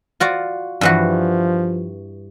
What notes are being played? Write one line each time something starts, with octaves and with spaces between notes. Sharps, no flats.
F4 F#4 D5
G2 E3 F3 F#4